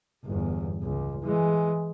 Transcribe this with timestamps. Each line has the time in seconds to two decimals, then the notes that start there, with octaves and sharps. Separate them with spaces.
0.25 G1 E2
0.82 C#2
1.23 E3 G#3